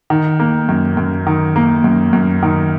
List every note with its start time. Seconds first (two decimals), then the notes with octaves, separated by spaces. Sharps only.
0.10 D#3
0.40 A#3
0.69 F#2
0.97 F#2
1.27 D#3
1.56 A#3
1.84 F#2
2.13 F#2
2.43 D#3